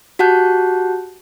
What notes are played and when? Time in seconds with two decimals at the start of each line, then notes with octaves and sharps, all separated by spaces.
0.19 F#4 G4 F#5 A5 F#6 G6